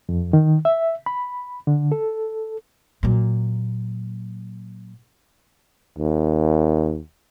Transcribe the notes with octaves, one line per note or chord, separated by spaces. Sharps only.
F2
D#3
E5
B5
D3
A4
A#2 F#3
D#2